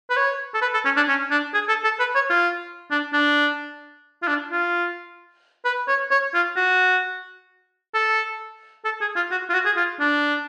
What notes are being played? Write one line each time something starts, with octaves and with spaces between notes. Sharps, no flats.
B4
C#5
A4
B4
A4
C#4
D4
C#4
D4
G#4
A4
A4
B4
C#5
F4
D4
D4
F4
D4
F4
B4
C#5
C#5
F4
F#4
A4
A4
G#4
F4
F#4
F4
F#4
G#4
F4
D4